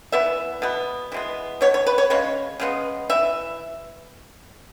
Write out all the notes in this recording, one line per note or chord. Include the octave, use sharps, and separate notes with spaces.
E3 B3 E5
B2 B3
E3 G#3 B3
B2 B3 C#5
C#5
B4
C#5
C#3 G#3 C#5
C#3 G#3 B3
E3 E5